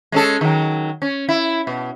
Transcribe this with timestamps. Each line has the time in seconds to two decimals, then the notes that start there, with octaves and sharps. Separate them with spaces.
0.12 G#3 C#4 A4
0.41 D#3 F#3
1.02 C#4
1.29 E4
1.67 B2